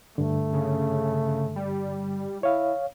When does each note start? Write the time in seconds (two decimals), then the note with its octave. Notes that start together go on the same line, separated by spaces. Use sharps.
0.18 G2 D3 A3
0.53 C#3
1.56 G3
2.43 E4 C#5 F5